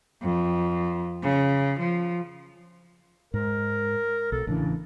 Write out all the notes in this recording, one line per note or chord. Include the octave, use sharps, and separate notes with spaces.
F2
C#3
F3
G#2 A#4
B1 A4
A1 C#3 E3 D4